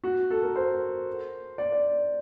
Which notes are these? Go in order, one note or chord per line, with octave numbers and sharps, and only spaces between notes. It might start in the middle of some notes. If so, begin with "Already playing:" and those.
F#4
A4
A#4
C5
D5
D5